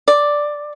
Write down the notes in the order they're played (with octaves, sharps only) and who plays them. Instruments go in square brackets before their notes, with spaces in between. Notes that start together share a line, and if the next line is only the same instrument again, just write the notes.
[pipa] D5